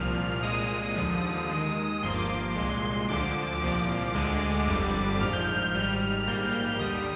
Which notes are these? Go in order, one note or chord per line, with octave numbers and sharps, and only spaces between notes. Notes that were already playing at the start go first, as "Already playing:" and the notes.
Already playing: C2 A#2 F3 F6
C2 A#2 G#3 D#6
D#2 D3 F3
D#2 D#3 G#3
G1 G2 F3 A#3 C6
D6
C6
C2 A#2 G#3 C6
C6
D2 D3 F3 D6
C2 A#2 F3
D2 D3 G#3
G1 F2 D3 G3
A#1 G#2 F3 F6
G6
F6
G6
G#1 G#2 G3 F6
A#1 G#2 G3 A#3 G6
F6
F6
D#2 D3 G3 D#6